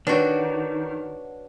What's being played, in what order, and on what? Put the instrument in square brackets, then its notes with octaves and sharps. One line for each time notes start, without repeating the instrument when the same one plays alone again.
[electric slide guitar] D#3 [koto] D4 F#4 [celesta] B4 C#5